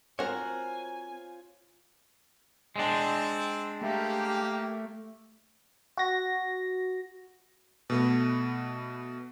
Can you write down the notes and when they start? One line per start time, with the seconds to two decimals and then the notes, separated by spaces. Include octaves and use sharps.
0.19 C4 F4 F#4 A#4 C5 C#5 G#5
2.76 G#3 C4 D4
3.82 A3 A#3 G4
5.98 F#4 A#6
7.90 B2 A3 B3